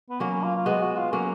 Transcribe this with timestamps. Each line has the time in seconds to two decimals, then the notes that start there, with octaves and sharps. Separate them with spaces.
0.10 B3
0.20 F#3 A#3 C#4
0.43 F4
0.56 F4
0.66 G#3 B3 F#4
0.82 F#4
0.97 F4
1.12 F#3 A#3 C#4